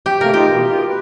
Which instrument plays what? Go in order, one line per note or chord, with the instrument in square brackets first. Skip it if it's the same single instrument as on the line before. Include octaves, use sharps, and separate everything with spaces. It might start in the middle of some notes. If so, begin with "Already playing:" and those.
[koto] G4
[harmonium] C3 A3 A#3 [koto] A#4
[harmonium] D#4 F4 [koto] G4
[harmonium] B2 E3
F4 A#4
B4